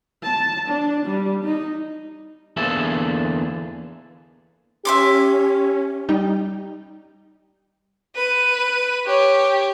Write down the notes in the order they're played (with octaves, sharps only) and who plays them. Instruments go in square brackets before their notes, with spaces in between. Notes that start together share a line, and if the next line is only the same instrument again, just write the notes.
[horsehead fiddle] A5
D4
G3
D#4
[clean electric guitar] E2 D3 A#3 G#4 A4 E5
[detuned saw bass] C#4 [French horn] G4 [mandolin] E5 C6 D6
[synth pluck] G3 D#4 G5
[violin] B4 D#7
G4 C#5